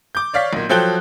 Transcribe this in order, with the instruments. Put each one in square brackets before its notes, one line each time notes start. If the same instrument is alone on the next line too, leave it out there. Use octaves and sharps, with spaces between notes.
[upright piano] D6 G6
C#5 D5 F5 C#6 B6
B1 A#2
F3 F#3 A4 G5 F#6 G7